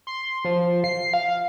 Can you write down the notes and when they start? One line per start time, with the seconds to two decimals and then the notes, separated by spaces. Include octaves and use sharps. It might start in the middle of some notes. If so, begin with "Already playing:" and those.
0.07 C6
0.45 F3
0.84 C7
1.14 F5